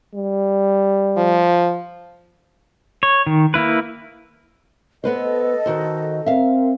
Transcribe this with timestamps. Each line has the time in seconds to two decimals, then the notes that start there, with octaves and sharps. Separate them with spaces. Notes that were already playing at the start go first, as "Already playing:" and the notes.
0.14 G3
1.17 F3
3.03 C#5
3.26 D#3
3.54 A#3 E4 B4
5.04 B3 A4 B4 C5 D#5
5.66 D#3 F#4 C5
6.26 C4 A#4 E5 F5